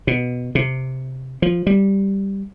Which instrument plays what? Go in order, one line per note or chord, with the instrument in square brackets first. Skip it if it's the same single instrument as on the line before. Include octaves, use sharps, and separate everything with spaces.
[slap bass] B2
C3
F3
G3